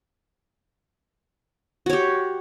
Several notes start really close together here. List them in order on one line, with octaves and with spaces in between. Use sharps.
F#4 C#5 G4